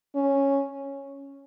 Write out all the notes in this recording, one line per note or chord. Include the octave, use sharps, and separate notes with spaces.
C#4